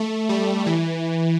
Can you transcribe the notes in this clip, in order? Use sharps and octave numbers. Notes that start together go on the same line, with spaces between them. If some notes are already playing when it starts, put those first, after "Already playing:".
Already playing: A3
G3
E3